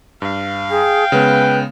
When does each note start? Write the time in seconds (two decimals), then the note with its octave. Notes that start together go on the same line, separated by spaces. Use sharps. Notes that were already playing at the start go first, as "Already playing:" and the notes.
0.22 G2 F5
0.70 G#4 G5
1.12 C#3 G#3 B3 B4